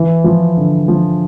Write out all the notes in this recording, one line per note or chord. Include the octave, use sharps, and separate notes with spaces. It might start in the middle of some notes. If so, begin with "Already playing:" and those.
Already playing: E3
F3
D3
F3